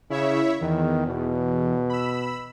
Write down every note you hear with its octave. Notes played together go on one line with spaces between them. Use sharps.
C#3 E4 C#5 E5
E2 D#3
B2
B5 E6